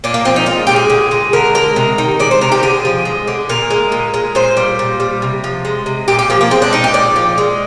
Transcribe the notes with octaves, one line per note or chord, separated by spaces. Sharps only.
A#2 D4
A#3
F3 C4
D#4
G#3 F4
A#2 G4
G#4
D3
G#3
D3 A#4
G#3 A#4
C3
D#3
G#3 D5
C5
C3 A#4
G4
D3 G#4
F3
G#3
D3
A#2 A#4
G#3
A#2
G#3
A#2 C5
G3
A#2
G3
C3
F3
G#3
C3
A#2 G4
G4
F3 A#3
A#3
G#3 C4
D4
A#2 D#4
G4
A#2 D5
F3
G#3